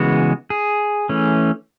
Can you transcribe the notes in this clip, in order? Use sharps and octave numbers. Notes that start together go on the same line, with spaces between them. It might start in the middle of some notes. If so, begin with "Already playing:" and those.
Already playing: C#3 E3 G#3 B3 F#4
G#4
E3 A3 C#4